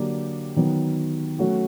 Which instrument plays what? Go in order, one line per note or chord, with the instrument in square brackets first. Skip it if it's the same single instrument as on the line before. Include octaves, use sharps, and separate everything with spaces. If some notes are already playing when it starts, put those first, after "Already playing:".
Already playing: [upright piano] D3 F#3 A#3 D4 G4
D#3 F#3 B3
F#3 A3 C#4 F#4